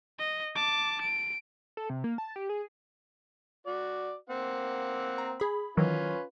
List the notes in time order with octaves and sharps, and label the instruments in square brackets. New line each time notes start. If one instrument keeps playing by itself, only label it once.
[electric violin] D#5
A5 D6
D7
[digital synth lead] A4
C3
A#3
A5
G4
G#4
[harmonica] F#4 D5
A#3 C4 F#5
[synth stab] A#5
G#4 B5
[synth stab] D#3 E3 F#3 [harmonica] C#4 F4 B4